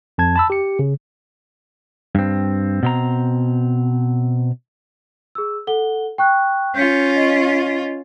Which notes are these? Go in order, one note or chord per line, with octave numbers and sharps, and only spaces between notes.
F2 A5 G#6
A5 B5 E6
G4 C#7
C#3
G2 C4
B2 C4 A#5
G#4 E6
A4 F#5 G7
G5 C#6 F#6
C#4 F4 G6 B6 C#7
D#5